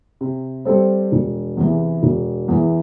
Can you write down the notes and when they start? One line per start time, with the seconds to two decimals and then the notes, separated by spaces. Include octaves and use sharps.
0.21 C3
0.65 G3 C4 A4 C5
1.12 E1
1.57 E2 C3 E3
2.03 E1
2.48 E2 E3